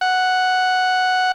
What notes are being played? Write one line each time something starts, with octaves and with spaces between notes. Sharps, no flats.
F#5